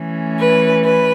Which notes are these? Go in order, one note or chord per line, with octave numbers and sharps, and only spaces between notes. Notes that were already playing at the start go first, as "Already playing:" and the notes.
Already playing: E3 A3 C#4
B4
B4